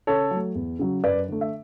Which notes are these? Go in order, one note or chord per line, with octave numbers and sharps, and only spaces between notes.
C#3 A4 C#5
F#3
A3
E2
C#3 F#3
F#2 B4 D5
D3 A3
E5